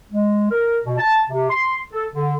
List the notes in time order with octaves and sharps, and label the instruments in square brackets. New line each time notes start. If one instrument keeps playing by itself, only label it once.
[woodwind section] G#3
A#4
B2
A5
C3
C6
A4
D3